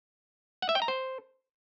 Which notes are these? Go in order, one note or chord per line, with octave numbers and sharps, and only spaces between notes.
F#5
E5
G5
A#5
C5